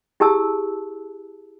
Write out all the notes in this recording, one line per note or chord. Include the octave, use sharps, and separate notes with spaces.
E4 G4 G#4 A5 E6